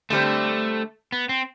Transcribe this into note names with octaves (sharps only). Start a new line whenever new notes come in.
D3 G3 A3 C4
B3
C4